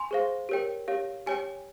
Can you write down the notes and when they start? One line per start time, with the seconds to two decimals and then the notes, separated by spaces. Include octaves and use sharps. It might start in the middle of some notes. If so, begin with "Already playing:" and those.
Already playing: G#5 C6
0.11 G#4 C5 F5
0.49 G4 A#4 C#5 G5
0.88 G4 C#5 F5
1.26 G4 C#5 G5 G#5